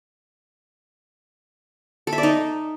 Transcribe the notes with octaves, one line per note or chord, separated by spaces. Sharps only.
A4
E5
D5
D#4